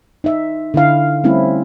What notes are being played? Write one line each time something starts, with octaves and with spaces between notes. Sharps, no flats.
D#4 E5
D3 E4 F5
G3 A3 C4 C#4 E4